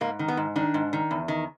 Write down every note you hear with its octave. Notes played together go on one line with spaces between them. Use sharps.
G#2 A#3
D#3
B3
G#2
D#3 D4
G#2
D#3
E2
D#3